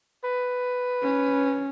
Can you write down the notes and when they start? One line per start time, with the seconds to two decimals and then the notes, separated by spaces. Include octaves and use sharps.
0.24 B4
1.03 C#4